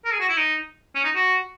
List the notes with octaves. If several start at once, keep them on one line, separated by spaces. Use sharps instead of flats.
A#4
G#4
F#4
E4
D#4
C#4
D#4
F#4